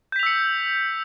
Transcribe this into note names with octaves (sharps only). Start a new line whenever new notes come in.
E6 G6 B6 C#7 F7